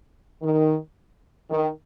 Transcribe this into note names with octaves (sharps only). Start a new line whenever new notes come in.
D#3
D#3